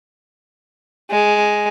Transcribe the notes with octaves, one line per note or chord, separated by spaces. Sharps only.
G#3